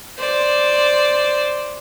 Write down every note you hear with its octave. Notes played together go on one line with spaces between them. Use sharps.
C5 D5